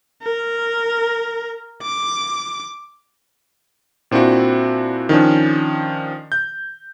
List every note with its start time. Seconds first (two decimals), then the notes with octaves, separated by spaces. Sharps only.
0.22 A#4
1.82 D6
4.11 A#2 C4 D4 E4 F#4
5.09 D#3 F3 C#4 D4
6.32 G6